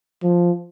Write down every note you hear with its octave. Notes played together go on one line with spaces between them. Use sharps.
F3